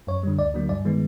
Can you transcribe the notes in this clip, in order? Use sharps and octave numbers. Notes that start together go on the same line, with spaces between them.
F#2 C#5
D3 G3
D2 D5
D3 F#3 A#3
G2 D5
D#3 G#3 B3